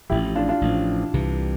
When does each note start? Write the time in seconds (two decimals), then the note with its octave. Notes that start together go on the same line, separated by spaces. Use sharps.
0.09 A1 A2 F3 E4 G4
0.35 D4 F4
0.49 D4 F4
0.61 A1 A2 F3
1.13 C2 C3 E3